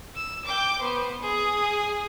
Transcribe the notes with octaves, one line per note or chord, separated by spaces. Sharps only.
E6
G5 D6
B3 C5
G#4